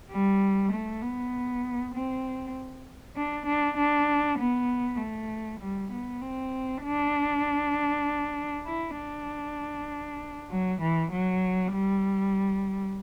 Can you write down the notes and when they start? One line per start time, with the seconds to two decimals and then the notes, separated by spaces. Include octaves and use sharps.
0.10 G3
0.72 A3
1.02 B3
1.94 C4
3.16 D4
3.46 D4
3.77 D4
4.38 B3
4.99 A3
5.60 G3
5.92 B3
6.21 C4
6.84 D4
8.66 E4
8.97 D4
10.50 F#3
10.81 E3
11.12 F#3
11.73 G3